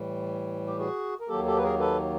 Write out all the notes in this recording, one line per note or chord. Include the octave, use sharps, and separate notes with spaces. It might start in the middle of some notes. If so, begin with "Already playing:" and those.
Already playing: A2 E3 G3
G4
F#4 G#4
A#4
D#2 D#3 F#3 A#3 G4 A4
G4 A4
B4
G#4 A#4
A4 B4